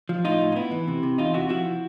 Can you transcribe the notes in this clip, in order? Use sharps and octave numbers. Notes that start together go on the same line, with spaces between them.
F3
A2 D#4 F4
A2
D#4
B3 E4
E3
C3
C3
E2 D#4 F4
C3 E4 F#4
F3 E4 F#4